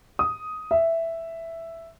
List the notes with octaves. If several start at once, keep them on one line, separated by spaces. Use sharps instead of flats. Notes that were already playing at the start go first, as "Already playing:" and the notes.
D#6
E5